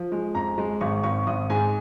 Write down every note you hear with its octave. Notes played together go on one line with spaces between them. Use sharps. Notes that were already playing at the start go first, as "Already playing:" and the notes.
Already playing: F3
G#3
F2 A#5
G#3
G#1 C#6
G#1 C#6
G#1 D#6
G#2 G#5